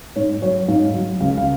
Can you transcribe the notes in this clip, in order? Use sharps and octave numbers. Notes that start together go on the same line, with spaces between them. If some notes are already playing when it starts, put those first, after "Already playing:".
G#2 C#5
F#3 C#5
G#2 F5
F#3
C#2 F5
F5